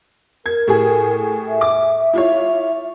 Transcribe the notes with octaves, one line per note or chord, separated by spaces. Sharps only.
A#4 G#6
A2 G4 G#4
E5
D6
E4 F4 C#5